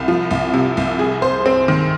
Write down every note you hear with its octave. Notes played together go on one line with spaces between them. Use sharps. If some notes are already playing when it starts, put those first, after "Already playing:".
Already playing: C2
F3
C2
C3
C2
G#4
C5
C4
D#3